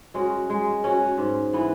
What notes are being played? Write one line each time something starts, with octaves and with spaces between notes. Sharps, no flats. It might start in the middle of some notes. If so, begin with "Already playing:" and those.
G#3 C#4 F#4
G#3
C#4 F#4
G#2
E3 B3